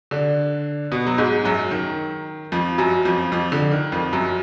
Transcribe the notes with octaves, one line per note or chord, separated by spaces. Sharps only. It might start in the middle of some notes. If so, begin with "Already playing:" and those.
D3 D4
B2 B3
F#3
G#2 G#3
F#2 F#3
D#3
F2 F3
F#2 F#3
F2 F3
F2 F3
D3
D#3
F2 F3
F#2 F#3